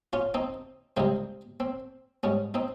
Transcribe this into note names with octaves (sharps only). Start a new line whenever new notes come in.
C#4 F4
C4 D#4
C#2 C3 G3 C4 D#4
C4
G#2 G3 C#4
C4 D#4